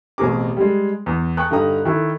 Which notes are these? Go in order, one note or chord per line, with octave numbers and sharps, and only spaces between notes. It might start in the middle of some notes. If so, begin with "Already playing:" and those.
A1 B2 C4 G#4 A#4 D6
G3 G#3
E2
G5 A5 C#6 D#6 F#6
G2 D3 D#4 G5 A#5 D#6
D#3 E4 A4